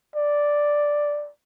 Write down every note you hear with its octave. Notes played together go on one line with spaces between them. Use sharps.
D5